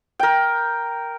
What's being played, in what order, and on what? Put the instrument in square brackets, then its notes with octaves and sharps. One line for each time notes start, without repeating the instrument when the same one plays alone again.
[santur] A#4 G5